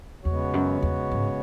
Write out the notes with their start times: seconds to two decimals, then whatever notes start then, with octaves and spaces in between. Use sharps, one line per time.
0.25 E2 C#3 G#3 B3 F#4 C#5
0.54 F#2
0.82 E2
1.11 G#2